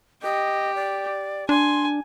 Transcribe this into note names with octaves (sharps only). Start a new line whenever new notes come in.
G4 D#5
D5
D4 G#5 C6